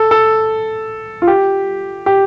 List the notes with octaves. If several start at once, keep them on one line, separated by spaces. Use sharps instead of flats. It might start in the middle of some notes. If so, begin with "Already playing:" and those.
Already playing: A4
A4
F4
G4
G4